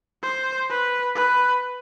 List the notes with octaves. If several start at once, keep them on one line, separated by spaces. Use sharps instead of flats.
C5
B4
B4